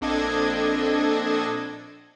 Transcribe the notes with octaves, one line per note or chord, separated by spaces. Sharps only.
A#1 C4 D4 A4 D#5 G#6